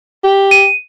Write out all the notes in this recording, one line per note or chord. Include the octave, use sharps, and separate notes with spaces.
G4
D#7